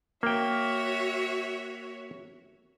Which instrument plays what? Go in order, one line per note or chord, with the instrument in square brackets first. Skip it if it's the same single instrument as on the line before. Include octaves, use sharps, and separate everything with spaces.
[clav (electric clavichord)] A#3 G5 [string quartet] F#4 C#5 E5